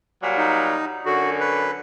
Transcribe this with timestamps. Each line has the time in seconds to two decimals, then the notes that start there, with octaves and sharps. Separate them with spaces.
0.22 A#2 F#3 G3
0.37 D#4
1.06 F#2 D3 F#4
1.40 B4